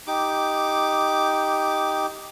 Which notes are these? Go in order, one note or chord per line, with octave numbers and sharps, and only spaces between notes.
D#4 G4 D6